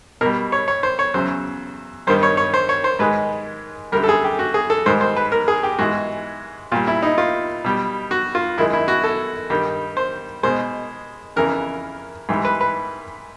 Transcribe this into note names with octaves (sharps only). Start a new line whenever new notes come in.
B2 G3 A#4
C#5
C#5
C5
C#5
E2 C#3 F#3 C5
G2 D#3 G3 C5
C#5
C#5
C5
C#5
C5
G#2 D#3 G#3 B4
F#2 D3 G3 A#4
A4
G#4
G4
F#4
G#4
A4
G#2 D#3 G3 C5
C5
B4
A#4
G#4
G4
G#2 E3 G#3 F#4
A#2 G3 F4
E4
D#4
F4
B2 G3
F#4
F4
F#2 D#3 G#3 E4
E4
F#4
A4
G2 D#3 G3
C5
B2 G#3 C5
F2 C#3 E3 A#4
G#2 E3 G3
B4
B4